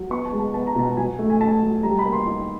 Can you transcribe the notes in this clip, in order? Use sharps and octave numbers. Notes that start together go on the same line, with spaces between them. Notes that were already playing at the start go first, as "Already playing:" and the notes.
Already playing: F#3
B3 C#6
A5
G#3
A5
B3 A5
A#5
B2 A5
F#3 G#5
A3
G#5
A3 A5
F#3
G3 A#5
B5
A#3
C6
D#4